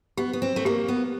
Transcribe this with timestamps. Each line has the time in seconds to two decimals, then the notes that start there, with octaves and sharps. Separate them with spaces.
0.17 B3 G4
0.33 B3
0.42 C4
0.56 A3
0.65 A#3 G4
0.88 B3